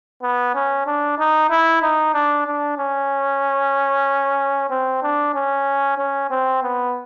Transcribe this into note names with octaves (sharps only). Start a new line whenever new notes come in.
B3
C#4
D4
D#4
E4
D#4
D4
D4
C#4
C4
D4
C#4
C#4
C4
B3